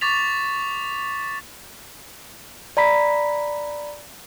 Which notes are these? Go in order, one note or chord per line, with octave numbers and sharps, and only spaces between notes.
C#6 D6 A6 B6 F7
D5 A#5 B5 B6